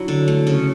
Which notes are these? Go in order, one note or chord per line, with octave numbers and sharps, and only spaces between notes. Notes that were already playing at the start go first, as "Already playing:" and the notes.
Already playing: F#3 D4 E4
D3
A3
C#3